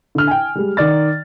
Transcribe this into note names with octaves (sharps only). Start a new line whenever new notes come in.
D3 F6
G5 G#5
G3 G#3
D#3 D#4 D5 F6 A6